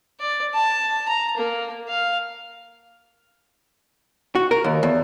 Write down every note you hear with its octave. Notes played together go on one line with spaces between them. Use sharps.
D5
A5
A#5
A#3
F5
F#4
A#4
D#2
E2